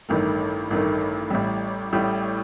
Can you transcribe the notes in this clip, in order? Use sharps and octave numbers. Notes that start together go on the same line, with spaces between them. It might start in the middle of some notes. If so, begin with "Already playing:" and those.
A1 G2 D#3 A3
A1 G2 D#3 A3
A1 A2 G3
A1 A2 G3